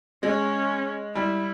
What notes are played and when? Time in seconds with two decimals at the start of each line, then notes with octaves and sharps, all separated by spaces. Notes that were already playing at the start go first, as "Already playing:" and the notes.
0.23 G#3 C#4
1.15 G3 E4